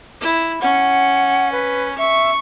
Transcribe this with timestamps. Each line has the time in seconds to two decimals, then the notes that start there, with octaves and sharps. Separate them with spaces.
0.21 E4
0.62 C#4 F#5
1.52 B4
1.98 E5 C#6